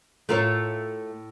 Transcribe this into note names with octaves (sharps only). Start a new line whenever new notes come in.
A2 A3 F4 A#4 C#5